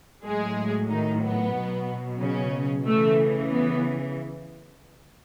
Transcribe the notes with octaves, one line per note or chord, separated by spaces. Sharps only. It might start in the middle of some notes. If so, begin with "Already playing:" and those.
A2 F#3 G#3 G#4
D#3 D#4
B3
B2 F#3
C#3 C#4
C#3 E3 A3
B3